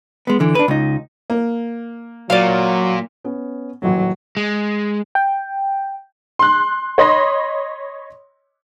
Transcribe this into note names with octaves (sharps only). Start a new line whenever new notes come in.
G#3 B3
D3 E3
D4 B4
C#2 D#4
A#3
A#2 F#3 D5 F5
B3 C#4
D#1 A1 F#3
G#3
G5
C6 F#6
C#5 D#5 B5 C6 A#6